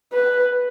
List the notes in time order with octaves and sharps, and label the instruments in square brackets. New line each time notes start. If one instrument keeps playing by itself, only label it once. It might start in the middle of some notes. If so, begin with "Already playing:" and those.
[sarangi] B4